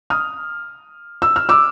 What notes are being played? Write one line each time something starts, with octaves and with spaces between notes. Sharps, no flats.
D#6 F6
E6
F6
D6 E6